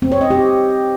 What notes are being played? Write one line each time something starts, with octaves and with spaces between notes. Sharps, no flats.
C4
C#5
D#5
G4